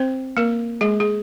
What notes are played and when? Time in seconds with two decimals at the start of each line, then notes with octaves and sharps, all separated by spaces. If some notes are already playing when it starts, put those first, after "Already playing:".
Already playing: C4 C5
0.37 A#3 A#4
0.81 G#3 G#4
1.00 G#4